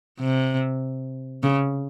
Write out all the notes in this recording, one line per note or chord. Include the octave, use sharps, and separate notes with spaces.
C3
C#3